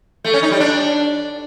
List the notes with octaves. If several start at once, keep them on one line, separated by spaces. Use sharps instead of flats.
A3
C#4
D#4
G3
D4